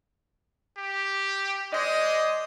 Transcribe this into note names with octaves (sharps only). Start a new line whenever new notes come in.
G4
G#3 C5 D5 D#5